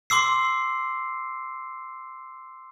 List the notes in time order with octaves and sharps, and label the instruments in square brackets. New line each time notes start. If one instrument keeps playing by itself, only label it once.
[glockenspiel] C6 D6 E6 C7